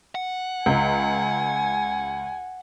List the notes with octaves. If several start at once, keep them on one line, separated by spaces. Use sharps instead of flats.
F#5
C#2 G#5